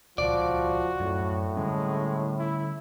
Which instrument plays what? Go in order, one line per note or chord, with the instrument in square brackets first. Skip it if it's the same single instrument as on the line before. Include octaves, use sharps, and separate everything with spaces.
[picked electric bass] D#1 C#2 [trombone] F3 [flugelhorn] F#4 [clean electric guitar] D5
[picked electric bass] F#2 [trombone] A2
[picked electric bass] D3 G3 C#4 [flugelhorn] G#3
[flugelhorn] E4